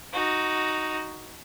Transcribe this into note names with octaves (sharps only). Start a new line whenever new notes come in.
D#4 F#4